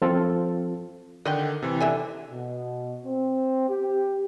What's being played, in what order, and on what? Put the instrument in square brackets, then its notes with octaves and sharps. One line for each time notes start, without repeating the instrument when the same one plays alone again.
[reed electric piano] F3 C4 F4 A4
[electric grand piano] D3 D#3 [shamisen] D#5 F#5 G5
[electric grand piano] C3 E3
[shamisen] D3 E5 G#5
[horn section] B2
C4
G4